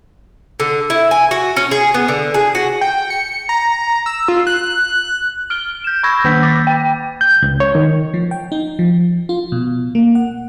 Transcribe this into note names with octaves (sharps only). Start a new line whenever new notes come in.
D3
E4
G#5
F#4
C#4
G#4
B3
D3
G#4
F#4
G5
C#7
A#5
E6
F4
F#6
F6 D7 G7
G6 E7
B5 C#6 E6 G#6 A#6
D#3 A#3 G6 B6
D6 A6
G5
G6
C#2
C#5
D#3
F3
G5
D#4
F3
F4
B2
A#3
F#5